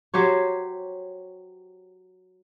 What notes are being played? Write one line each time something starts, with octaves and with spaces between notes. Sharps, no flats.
F#3 G4 C5 C#5